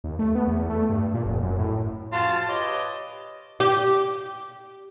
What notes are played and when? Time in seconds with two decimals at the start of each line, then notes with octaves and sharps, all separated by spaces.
0.04 D#2
0.19 A3
0.35 B3
0.47 E2
0.70 A3
0.90 G2
1.14 A#2
1.25 F1
1.42 F#2
1.59 A2
2.12 C#3 F3 F4 F#4 A5
2.48 G4 B4 C#5 D#5
3.60 G4